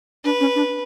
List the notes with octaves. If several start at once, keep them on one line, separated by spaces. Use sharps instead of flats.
D4 B4
C#4
D4